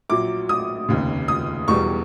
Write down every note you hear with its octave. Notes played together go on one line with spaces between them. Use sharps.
A#1 A#2 F#3 D6
D#6
F1 D#2 C#3
D#6
E1 E2 B2 G3 C#6